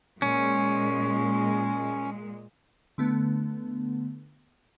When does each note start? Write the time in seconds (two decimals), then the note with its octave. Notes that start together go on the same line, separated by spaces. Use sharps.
0.22 A#2 G#3 C#4
2.98 D3 A3 B3